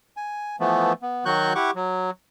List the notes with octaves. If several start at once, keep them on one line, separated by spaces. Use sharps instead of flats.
G#5
E3 F3 A3 B3
B3
D#3 F#3 F#4 C#6 F#6 G6
E4 G4 F#5 C#6 D6
F#3